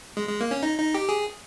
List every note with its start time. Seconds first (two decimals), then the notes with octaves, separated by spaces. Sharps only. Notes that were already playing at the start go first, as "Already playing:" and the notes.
0.17 G#3
0.29 G#3
0.41 A#3
0.51 C#4
0.63 D#4
0.78 D#4
0.94 G4
1.09 G#4